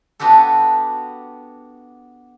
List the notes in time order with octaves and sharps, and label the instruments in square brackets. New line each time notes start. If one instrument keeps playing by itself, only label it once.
[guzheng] B3 D4 F#4 G4 A4